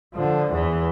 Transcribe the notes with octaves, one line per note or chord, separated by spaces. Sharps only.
D3 F3
E2 E3